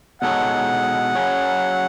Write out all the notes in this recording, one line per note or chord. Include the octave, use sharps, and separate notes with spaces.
B2 G#3 D#4 A4 C#5 F#5
F#3 C#4 G#4 C#5